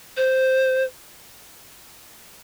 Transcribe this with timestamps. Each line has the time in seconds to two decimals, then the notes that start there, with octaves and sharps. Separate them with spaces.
0.17 C5